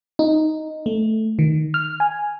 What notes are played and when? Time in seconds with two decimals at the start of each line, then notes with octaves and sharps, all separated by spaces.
0.19 D#4
0.86 A3
1.39 D#3
1.74 F6
2.00 G#5